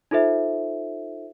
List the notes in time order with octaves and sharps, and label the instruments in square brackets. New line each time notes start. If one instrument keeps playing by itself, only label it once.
[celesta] D#4 F4 A4 C5 E5